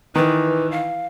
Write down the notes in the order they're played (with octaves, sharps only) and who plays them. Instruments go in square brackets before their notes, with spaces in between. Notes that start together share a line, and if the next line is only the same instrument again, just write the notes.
[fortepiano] D#3 [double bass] E3 [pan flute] B4
[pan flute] F5